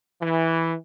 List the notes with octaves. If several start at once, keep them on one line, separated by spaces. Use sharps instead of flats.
E3